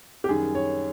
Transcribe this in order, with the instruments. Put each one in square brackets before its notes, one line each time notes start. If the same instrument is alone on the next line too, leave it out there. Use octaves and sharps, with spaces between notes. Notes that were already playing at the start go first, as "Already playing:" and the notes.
[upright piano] G4
F#2 D#3 G3 G#4
C#5